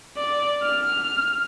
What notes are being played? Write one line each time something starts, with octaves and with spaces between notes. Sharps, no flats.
D5
F6